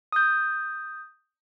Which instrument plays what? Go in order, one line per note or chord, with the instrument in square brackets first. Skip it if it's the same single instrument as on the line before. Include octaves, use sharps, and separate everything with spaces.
[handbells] D#6 G6